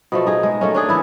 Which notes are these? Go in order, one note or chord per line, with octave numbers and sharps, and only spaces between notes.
B2 F3 A3
D#4 G#4
G#3
A3 A#3 C#4
C#4 D4 G#4
E3 E4